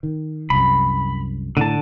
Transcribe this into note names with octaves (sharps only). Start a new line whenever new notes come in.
D#3
C2 F#2 B5
A2 D3 A5